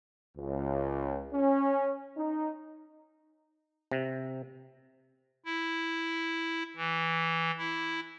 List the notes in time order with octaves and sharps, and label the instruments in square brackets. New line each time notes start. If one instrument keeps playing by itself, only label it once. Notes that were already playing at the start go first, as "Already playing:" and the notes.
[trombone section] C#2
C#4
D#4
[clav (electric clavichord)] C3
[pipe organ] E4
E3
E4